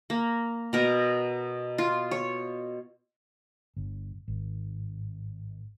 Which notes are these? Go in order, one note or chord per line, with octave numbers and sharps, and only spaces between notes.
A#3
B2 A#4
F4
C#5
G1
G#1